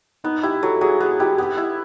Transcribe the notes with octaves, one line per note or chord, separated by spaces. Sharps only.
B3 D#4
E4 G4
F#3 A4
F#3 G#4
B3 G#4
E4 G4
B3 G4
E4